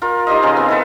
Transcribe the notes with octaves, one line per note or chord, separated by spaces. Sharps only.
F4 A#4
D#4 G4 C5 D#5
C#3 F3 F4 G#4
B3 C4
E4 A4 B4